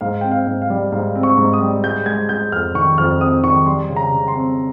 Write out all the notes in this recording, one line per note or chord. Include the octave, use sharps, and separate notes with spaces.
G#2 F5
C4 G5
F5
G#2
F5
G3
G#2 F5
C4
C#6
G#2
D#6
G3
G#3 G6
G#3 G#6
G#3 G6
F2 F6
D#3 C#6
F2 F6
C4 D#6
D#3 C#6
G3 C6
C#3
A#5
C#3
C6
C4